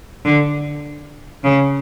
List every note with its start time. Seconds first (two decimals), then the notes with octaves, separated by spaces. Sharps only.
0.25 D3
1.44 C#3